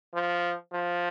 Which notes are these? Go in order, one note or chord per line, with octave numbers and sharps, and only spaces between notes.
F3
F3